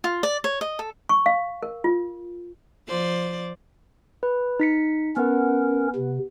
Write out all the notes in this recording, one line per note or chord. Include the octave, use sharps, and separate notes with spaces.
F4
D5
C#5
D#5
A4
C#6
F5
A#4
F4
F3 C5 D5
B4
D#4 B6 C#7
B3 C#4 A#4 B4 F#5
C3